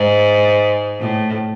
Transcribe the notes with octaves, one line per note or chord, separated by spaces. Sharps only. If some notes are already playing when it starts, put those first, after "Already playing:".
Already playing: G#2
A2